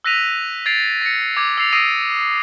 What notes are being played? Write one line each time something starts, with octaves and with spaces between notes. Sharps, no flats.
E6 F#6 A#6 B6 D#7 F7
G#6 A6 C7 D7 F7
A#6 C#7
D6 G#6
E6 A6 C7 F7
D#6 E6 A#6 C7 D7 D#7